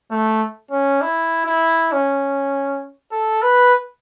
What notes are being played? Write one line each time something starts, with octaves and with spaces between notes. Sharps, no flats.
A3
C#4
E4
E4
C#4
A4
B4